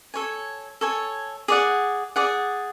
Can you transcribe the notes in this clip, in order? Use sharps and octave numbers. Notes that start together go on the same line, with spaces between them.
A4 C#5 G#5
A4 C#5 G#5
G#4 D5 F#5
G#4 D5 F#5